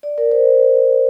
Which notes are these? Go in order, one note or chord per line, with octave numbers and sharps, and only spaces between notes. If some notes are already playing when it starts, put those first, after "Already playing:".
D5
A#4
C5